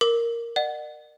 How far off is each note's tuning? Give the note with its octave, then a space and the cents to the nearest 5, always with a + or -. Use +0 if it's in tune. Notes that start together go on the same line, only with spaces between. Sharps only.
A#4 +0 D6 +0
D5 +45 F#5 +0